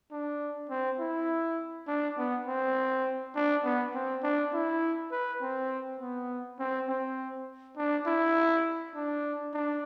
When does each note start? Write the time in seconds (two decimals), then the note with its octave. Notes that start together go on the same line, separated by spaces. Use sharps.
0.12 D4
0.70 C4
1.00 E4
1.87 D4
2.18 B3
2.47 C4
3.35 D4
3.64 B3
3.94 C4
4.23 D4
4.53 E4
5.12 B4
5.42 C4
6.00 B3
6.59 C4
6.89 C4
7.77 D4
8.07 E4
8.95 D4
9.54 D4